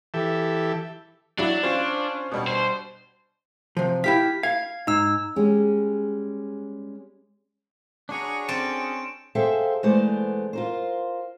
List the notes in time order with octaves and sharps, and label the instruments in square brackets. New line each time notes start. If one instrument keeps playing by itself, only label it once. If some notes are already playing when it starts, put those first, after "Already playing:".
[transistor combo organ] E3 G4 A4 E5
[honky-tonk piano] F#3 E4 [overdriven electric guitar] D4
[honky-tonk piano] C#4 F4 C5
B2 G3 D4
[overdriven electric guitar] C5
[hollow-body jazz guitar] C3 F3
[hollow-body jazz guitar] E4 G4 F5 [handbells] B6
[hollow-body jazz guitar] F5 [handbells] G#6
[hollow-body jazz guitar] G#2 [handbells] D#4 E6
[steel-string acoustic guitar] G3 G#3 C#4
[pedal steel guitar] D4 F#4 G#4 [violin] C#5 A#5
[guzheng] C4 D5 [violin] C#4 [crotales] D7 E7
[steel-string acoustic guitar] G#4 A4 C5 E5 F5 G5
E2 G#3 A3 B3 C5 D5
F4 A#4 C5